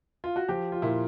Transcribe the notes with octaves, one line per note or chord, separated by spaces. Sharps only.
F4
F#4
F3 G4
F4
A#2 E4